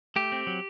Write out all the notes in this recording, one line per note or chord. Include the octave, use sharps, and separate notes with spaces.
A3 G4
C4
F#3